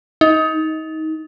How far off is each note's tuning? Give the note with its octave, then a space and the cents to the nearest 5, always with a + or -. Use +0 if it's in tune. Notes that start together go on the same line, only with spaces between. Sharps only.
D#4 +25